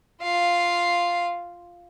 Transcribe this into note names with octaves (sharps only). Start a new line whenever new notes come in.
F4 F5